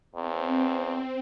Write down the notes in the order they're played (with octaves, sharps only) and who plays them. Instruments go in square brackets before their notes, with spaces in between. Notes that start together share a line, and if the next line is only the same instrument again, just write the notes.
[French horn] E2 [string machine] C4